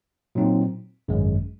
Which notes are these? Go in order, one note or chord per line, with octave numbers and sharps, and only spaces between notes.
A#2 F#3 C4 D#4
G#1 F#2 C#3 G#3